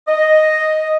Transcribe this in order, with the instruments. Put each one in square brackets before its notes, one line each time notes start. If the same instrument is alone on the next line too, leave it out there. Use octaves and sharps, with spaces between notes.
[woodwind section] D#5